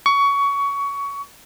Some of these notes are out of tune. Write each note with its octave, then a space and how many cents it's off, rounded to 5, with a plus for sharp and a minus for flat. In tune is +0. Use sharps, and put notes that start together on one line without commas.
C#6 +20